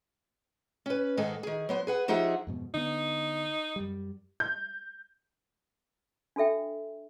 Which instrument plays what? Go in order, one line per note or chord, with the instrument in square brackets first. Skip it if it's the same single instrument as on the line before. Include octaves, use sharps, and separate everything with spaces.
[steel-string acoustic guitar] C#4 B4
G#2 D#3 D#4 G#4 A4 G#5
D#3 G#4
F#3 B3 C5
G#4 B4 F#5
F3 D#4 G4 G#4 E5 F#5
[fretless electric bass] F2 G#2 B2
[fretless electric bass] D3 B3 [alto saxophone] D#4
[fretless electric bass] F#2 G3
[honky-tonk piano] G6
[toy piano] D4 F#4 A4 E5 G5